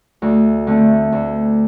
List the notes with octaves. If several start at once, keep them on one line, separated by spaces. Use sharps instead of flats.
D2
D3 A3 C4
D2